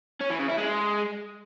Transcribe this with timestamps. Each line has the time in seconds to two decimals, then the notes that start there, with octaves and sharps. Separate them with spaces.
0.21 C#4
0.30 E3
0.39 C#3
0.48 E4
0.58 G#3